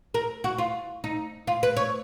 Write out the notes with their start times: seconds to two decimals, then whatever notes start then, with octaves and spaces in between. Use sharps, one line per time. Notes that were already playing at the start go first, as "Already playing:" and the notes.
0.14 A#4
0.44 F#4
0.58 F4
1.04 D#4
1.47 F4
1.63 B4
1.77 C#5